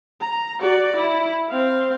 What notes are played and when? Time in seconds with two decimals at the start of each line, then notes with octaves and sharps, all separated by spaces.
0.21 A#5
0.60 F#4 D5
0.96 E4
1.50 C4 F5